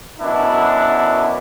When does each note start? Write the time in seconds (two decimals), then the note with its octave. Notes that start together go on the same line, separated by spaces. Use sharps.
0.19 F#2 B2 D4 E4